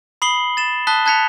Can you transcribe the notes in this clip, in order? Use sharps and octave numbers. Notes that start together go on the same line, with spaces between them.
B5 D#6 C7 F#7 G7
A6 E7
A5 D#6 F#6 B6 G7
A5 F#6 G#6 B6 C#7 F7